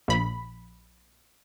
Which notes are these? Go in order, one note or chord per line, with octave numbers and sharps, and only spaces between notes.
A#1 B5